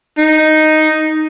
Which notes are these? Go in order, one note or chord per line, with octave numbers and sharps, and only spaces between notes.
D#4